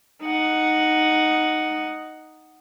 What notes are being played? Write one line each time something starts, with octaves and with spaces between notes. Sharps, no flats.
D#4 F#5